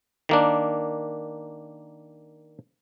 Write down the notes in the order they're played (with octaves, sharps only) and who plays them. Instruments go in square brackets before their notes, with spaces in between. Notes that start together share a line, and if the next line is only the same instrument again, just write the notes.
[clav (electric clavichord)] D#3 A#3 D4